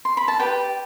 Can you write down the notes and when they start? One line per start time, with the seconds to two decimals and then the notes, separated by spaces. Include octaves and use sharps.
0.05 C6
0.17 B5
0.28 A5
0.40 G4 B4 D5 G5